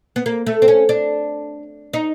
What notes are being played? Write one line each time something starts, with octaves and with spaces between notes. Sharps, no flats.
B3
A#3
A3
C4
C#4
D4
D#4